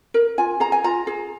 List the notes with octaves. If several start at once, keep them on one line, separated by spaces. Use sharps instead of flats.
A#4
F4 G#5
G#4 A#5
G#5
F4 A#5
G#4